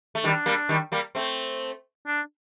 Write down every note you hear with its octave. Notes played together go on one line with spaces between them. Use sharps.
A3
D#3 G3 D4
G3 A#3
D#3 G3
G3 A#3
A3 C4
D4